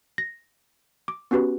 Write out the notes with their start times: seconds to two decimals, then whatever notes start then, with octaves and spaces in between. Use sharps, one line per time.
0.18 A#6
1.08 D6
1.31 B3 C#4 F#4 G4 B4